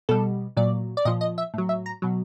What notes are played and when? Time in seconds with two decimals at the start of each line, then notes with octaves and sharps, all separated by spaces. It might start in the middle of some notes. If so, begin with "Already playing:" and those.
0.09 B2 G3 A4
0.57 A#2 F#3 D5
0.97 D5
1.05 A#2 F3 D#5
1.21 D#5
1.38 E5
1.54 A2 F#3
1.69 E5
1.86 A#5
2.02 B2 F#3